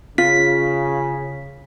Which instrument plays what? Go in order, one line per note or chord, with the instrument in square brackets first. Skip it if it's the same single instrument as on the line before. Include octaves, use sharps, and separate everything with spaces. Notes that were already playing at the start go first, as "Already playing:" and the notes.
[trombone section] C#3 [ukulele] F4 [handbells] B6